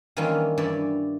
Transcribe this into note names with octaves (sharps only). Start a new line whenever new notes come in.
D#3 E3 G3 A#3 C#4 F4
G2 E3 C#5 D5